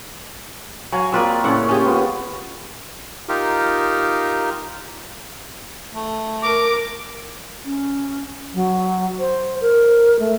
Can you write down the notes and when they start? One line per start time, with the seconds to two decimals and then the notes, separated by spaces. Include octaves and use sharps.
0.92 F#3 C#5 F5 G#5
1.12 A#3 C4 F4 G#4 B4 D5
1.44 A2 C#3 A#3 C#4 F#5
1.69 C#4 G4 G#4 G#5
1.86 B3 F4
3.29 D#4 F4 G4 A#4
5.93 A3
6.42 A#4 D6
7.63 C#4
8.54 F#3
9.19 C5
9.61 A#4
10.20 A3